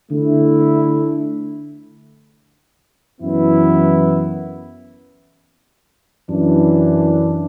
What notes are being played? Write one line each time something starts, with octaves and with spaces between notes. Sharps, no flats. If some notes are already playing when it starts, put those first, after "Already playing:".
D3 A3 E4
F#2 E3 B3 E4
F#2 E3 D4